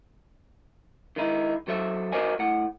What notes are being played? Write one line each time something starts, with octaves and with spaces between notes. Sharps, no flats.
D#3 G#3 D#4 E4
F#3 A4 C5 E5
F#4 A#4 C5 D5 D#5 G#5
A2 F#5